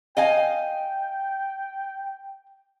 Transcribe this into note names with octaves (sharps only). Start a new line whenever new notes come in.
D#5 F5 G5 G#5